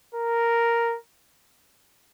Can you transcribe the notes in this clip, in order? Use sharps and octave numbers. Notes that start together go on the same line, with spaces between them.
A#4